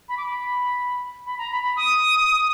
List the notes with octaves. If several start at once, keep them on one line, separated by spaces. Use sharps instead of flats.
B5
D6
B5
B5
A#5
B5
B5
D#6